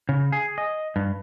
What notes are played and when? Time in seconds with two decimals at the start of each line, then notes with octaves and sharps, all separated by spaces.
0.09 C#3
0.32 G#4
0.58 D#5
0.96 G2